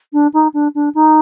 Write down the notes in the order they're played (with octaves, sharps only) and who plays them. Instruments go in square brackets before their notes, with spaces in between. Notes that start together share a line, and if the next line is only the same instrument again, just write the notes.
[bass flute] D4
D#4
D4
D4
D#4